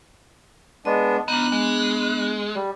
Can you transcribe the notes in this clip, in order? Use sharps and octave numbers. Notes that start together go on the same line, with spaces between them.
G#3 B3 D4 D#5
F3 B3 D4 D#4 F#6
G#3
G3